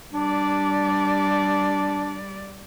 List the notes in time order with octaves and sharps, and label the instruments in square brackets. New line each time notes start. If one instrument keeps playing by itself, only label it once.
[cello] G3 D5 [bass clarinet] D4